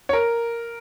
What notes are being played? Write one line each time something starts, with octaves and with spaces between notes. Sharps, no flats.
C#5
A#4